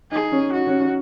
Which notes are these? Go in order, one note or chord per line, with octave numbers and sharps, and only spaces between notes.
D#4 G#4
C#4
D#4 F#4
C#4
C#4